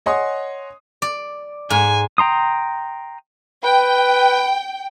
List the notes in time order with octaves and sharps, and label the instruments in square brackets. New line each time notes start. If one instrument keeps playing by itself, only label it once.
[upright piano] C#5 D#5 F#5 G#5 C6 D#6
[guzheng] D5
[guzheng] G#2 [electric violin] G#5
[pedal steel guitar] G5 A#5 C6 D#6
[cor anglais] B4 [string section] G5